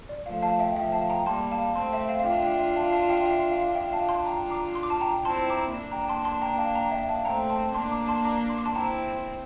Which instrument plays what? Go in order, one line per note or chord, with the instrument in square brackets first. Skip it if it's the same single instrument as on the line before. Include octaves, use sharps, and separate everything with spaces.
[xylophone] D5
[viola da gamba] F3 A3 [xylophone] F5
[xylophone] F5 A5
E5 G5
[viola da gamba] F3 A3 [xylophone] E5 G5
[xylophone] F5 A5
G5 A#5
[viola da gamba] G3 A#3 [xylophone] A5 C6
[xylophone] F5 A5
[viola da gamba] A3 C4 [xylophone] A5 C6
[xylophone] E5
F5
F5
[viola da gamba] D4 F4 [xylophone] E5 G5
[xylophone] E5 G5
E5 G5
F5 A5
F5 A5
E5 G5
E5 G5
F5
[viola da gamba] D4 F4 [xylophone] E5 G5
[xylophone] F5 A5
A5 C6
G5 A#5
A#5 D6
C6
D6
A5 C6
G5 A#5
[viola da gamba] C4 E4 [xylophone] A5 C6
[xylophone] A#5 D6
[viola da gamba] A#3 D4
[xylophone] G5 A#5
A5 C6
A5 C6
G5 A#5
F5 A5
G5 A#5
E5 G5
F5 A5
[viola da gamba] A3 C4 [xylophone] G5 A#5
[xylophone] A5 C6
[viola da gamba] A#3 D4 [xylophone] A5 C6
[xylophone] A#5 D6
A5 C6
A#5 D6
C6
D6
A5 C6
[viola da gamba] C4 E4 [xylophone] G5 A#5